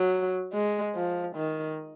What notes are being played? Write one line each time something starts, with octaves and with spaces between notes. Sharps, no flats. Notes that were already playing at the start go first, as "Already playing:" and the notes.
Already playing: F#3
G#3
F3
D#3